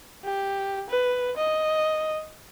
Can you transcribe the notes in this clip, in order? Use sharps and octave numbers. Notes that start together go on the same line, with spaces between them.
G4
B4
D#5